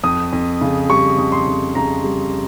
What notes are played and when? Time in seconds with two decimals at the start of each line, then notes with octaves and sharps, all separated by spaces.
0.03 F2 D#6
0.33 F2
0.61 C#3
0.89 G3 C#6
1.18 F2
1.32 C6
1.47 F2
1.75 C#3 A#5
2.04 G3